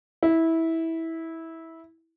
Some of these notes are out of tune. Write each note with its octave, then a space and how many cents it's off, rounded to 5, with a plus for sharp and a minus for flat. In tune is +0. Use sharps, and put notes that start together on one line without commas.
E4 -15